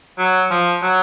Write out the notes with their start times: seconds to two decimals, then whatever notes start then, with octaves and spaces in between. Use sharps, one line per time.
0.18 F#3
0.50 F3
0.82 F#3